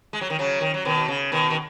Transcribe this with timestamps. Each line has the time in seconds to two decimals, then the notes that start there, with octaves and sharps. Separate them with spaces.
0.13 G#3
0.21 F#3
0.30 D#3
0.39 C#3 F#3
0.61 D#3
0.74 F#3
0.85 B2 D#3
1.08 C#3
1.32 B2 D#3
1.50 D#3